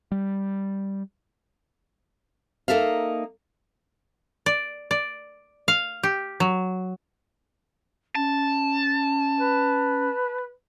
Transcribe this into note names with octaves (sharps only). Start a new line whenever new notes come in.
G3
A#3 D#4 A4 E5 F5
D5
D5
F5
G4
F#3
C#4 A5
B4